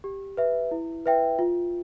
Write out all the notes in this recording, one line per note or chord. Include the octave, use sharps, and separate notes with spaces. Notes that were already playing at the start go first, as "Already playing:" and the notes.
G4
B4 E5
E4
B4 E5 G5
F4